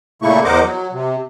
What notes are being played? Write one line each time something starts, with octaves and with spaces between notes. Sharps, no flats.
A#2 C#3 A3 A#3 E4 C#6
E2 A#4 C5 D#5 F#5 D6
F#3
C3